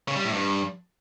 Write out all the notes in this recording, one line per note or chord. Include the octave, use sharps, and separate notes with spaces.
C#3
G3
A2
G2